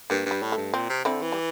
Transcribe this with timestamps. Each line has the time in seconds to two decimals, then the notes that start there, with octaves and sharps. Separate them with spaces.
0.10 G2 A#3
0.26 G2
0.31 G3
0.42 A2
0.52 G2 A3
0.73 A#2 C4
0.89 C3
1.05 D3 C4 E4
1.22 E3
1.32 G3